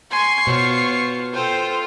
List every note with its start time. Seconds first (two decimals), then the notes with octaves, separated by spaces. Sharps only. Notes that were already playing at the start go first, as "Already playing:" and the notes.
0.11 G#5 C6 C#6 C7
0.47 B2 F4 C5 C#5
1.34 F4 A4 C5 G5